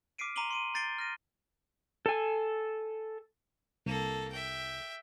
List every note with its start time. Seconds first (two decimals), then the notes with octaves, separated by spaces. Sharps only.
0.18 D6 F6 B6 C7 D7 D#7
0.36 A#5 C6 D6 D#7 F#7 G7
0.51 C6 D7 D#7
0.74 A#5 G6 A6 C7 D7 G7
0.99 F6 A#6 D#7
2.06 A4 G#5
3.86 C2 A#3 A4
4.32 E5 G5